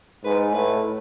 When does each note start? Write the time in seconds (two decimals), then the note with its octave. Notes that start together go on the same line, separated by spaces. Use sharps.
0.24 G#2 B4
0.53 A2 B4